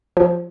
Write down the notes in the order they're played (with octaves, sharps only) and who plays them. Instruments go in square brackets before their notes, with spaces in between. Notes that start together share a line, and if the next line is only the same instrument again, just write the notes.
[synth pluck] F3